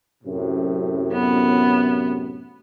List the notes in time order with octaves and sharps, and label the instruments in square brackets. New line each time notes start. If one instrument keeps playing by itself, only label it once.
[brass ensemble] F#2 A2 C3
[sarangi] B3